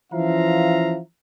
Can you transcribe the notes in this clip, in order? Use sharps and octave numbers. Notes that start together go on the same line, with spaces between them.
E3 F3 C#4 E5 F5 A#5